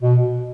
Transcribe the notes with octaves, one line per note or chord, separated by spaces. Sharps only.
B2